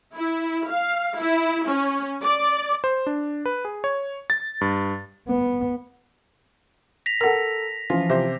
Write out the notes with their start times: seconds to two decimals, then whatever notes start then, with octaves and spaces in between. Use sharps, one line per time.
0.15 E4
0.70 F5
1.18 E4
1.67 C#4
2.23 D5
2.84 C5
3.07 D4
3.46 B4
3.65 G#4
3.84 C#5
4.30 A6
4.61 G2
5.28 B3
7.06 A#6 B6 F7
7.21 A4 A#4 F#5 A#5
7.90 E3 F3 C#4 F4
8.10 C3 G4 C5 E5